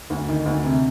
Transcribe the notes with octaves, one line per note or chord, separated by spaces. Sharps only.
D2
D#3
D2
C3